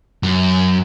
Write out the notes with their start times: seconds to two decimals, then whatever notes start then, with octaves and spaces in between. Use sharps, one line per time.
0.23 F#2